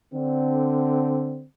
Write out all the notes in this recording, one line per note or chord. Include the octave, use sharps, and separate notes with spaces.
D3 C4